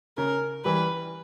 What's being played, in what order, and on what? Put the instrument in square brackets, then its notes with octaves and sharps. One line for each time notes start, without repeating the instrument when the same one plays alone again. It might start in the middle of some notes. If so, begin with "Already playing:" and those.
[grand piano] C#3 [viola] A#4
[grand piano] E3 G3 [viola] B4